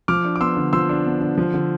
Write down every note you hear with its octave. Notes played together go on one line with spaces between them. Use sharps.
F3 D6 F6
D4
D6
B3 C6 E6
D3
F3 C6 E6
D4
B3
D3
F3
D3